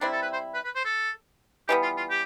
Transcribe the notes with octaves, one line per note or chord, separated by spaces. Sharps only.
C3 G3 C4 D4 E4
A4
B4
C5
B4
B4
C5
A4
E3 G3 B3 G4
F4
F4
G4